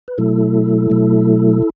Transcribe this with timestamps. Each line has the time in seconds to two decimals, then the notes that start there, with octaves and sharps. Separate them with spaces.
0.08 B4
0.18 B2 F#3 A3 E4 A4
0.90 B2 F#3 A3